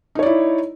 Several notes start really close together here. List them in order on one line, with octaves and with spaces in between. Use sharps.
D#4 C#5 D5 E4